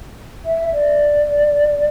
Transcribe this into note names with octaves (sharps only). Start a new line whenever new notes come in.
E5
D5